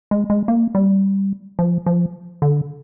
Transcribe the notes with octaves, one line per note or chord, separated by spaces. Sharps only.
G#3
G#3
A#3
G3
F3
F3
D3